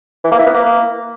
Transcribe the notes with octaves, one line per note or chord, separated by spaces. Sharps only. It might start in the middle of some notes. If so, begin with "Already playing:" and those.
E3
A#3
E4
B3
A#3